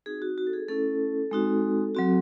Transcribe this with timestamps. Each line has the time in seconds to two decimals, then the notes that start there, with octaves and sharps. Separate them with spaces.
0.06 C4 D#4 F#4 G#4
0.22 F#4
0.38 F#4
0.47 A4
0.53 G#4
0.68 A3 C#4 E4 A4
1.31 G#3 C4 D#4 F#4
1.95 F#3 C4 F#4